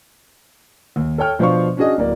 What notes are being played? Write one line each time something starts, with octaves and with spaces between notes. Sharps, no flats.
D#2
A4 C#5 G5 F6
B2 F3 D4 C5 F5 C#6
C#4 D4 F#4 G#4 D#5
D1 A#3 D5